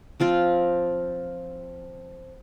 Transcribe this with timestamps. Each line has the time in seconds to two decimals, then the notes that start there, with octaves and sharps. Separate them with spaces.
0.20 F3 C4 F4